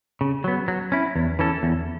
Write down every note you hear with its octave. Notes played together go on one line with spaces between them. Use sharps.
C#3
F#3 B3
F#3
C#4 E4
E2
E3 C#4 A4
E2